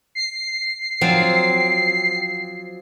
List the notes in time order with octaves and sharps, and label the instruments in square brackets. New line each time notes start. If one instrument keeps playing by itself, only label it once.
[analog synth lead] C7
[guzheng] F3 F#3 C4